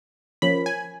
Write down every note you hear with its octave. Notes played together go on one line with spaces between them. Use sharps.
F3 A#3 C#4 B5
G#5